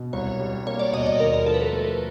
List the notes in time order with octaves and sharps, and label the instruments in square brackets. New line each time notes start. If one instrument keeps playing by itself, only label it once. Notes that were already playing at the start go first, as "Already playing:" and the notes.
Already playing: [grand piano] B2
[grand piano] C2 [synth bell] C#5
[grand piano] G3
[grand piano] A#3 [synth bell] C#5
[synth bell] D5
[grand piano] B2 [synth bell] D#5
[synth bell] D5
[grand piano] D#2 [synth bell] A#4
[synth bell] A#4
[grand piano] F3 [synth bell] A4
[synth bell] B4
A#4
[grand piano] A3